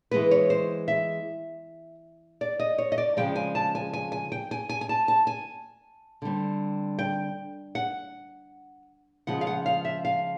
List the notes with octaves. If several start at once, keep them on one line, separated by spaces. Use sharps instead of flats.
E3 G#3 B3 B4
C#5
C5
E5
D5
D#5
C#5
D#5
D5
C#3 F3 G#3 C4 G5
G#5
A5
G#5
G#5
G#5
G5
G#5
G#5
G#5
A5
A5
G#5
D3 G3 C4
G5
F#5
C#3 F3 G#3 F#5
F5
F#5
F5
E5
F5